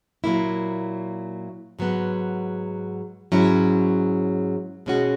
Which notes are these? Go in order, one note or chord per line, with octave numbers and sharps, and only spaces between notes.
A#2 F#3 A#3 E4
G#2 F#3 B3
G#2 F#3 C#4 E4
B2 G#3 C#4 F#4